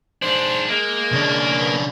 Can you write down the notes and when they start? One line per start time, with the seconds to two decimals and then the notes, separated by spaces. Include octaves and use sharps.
0.22 G#2 D4 C5
0.69 G#3 A#3
1.12 C#3 D4
1.61 B3